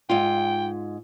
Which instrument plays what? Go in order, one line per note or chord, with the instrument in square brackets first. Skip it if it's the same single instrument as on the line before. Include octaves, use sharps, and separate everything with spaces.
[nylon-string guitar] G#2 F4 [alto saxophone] G5